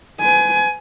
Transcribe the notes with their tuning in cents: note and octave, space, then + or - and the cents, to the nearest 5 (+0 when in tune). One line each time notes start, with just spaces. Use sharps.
B4 +45 G#5 +20